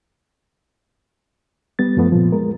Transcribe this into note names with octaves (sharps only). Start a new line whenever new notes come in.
G3 B3 A6
F#2 F3 A3 B3
A#2 F3
G#3 A#4